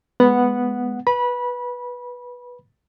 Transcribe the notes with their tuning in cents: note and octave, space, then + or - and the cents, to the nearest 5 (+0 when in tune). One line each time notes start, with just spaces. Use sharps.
G#3 +0 B3 +0 F#5 -5
B4 -10 B5 -25